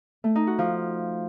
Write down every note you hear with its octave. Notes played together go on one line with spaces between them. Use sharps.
A3
D#4
F#4
F3